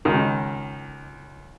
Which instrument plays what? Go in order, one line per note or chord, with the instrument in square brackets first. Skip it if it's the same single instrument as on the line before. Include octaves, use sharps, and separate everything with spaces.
[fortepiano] C#2 D#3